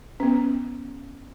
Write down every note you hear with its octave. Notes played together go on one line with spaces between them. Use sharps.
B3 C#4